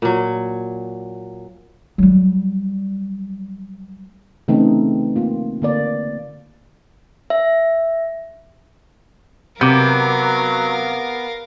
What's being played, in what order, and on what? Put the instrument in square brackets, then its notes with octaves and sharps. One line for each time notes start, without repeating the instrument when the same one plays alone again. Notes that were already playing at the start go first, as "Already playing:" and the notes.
[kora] A#2 F#3
[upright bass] F#3 G3
[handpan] C#3 E3 A3 C4 D#4
A#3 F4
D3 A#3 D5
[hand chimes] E5
[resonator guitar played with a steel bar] C3 [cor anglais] F#3 [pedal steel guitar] B3 D6 [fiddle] A#4 F5